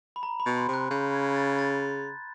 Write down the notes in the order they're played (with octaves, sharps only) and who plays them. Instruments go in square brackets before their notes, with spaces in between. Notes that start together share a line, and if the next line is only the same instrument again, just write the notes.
[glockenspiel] B5
A#5
B5
[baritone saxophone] B2
[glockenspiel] C6
[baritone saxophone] C3
[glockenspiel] F#6
[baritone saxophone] C#3 [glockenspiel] G6
[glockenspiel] G#6
A6
A6